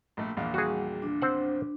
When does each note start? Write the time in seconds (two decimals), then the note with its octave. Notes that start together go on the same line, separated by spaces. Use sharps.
0.17 A#1 A3
0.37 A#1 E2 F5
0.54 G3 F#4 G#4
1.02 D4
1.22 C4 C5 F#5